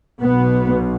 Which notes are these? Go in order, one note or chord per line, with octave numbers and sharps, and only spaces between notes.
B1 B2 B3